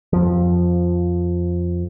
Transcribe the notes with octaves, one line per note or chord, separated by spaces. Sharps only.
F2 F3